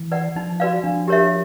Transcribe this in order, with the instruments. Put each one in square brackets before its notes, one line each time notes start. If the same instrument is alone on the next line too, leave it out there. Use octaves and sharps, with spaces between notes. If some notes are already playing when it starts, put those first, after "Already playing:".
Already playing: [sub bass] E3
[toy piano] B4 D5 F#5
[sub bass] F3 [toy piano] D#4
[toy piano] F#4 B4 D5 F5
[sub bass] F3 [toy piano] D4
[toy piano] G4 A#4 C#5 E5